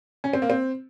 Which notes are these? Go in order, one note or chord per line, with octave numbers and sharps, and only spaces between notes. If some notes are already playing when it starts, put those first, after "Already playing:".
C#4
C4
A#3
C4